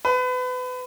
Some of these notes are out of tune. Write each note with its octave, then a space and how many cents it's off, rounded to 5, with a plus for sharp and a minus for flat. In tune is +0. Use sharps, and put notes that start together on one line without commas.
B4 +30